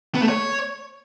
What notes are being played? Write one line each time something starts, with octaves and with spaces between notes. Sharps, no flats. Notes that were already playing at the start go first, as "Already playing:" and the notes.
B3
A3
C#5